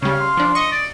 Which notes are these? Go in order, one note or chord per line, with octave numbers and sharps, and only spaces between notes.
C#3 G3 C#5 F5
C6
F3 D4
D#5 C#6
D5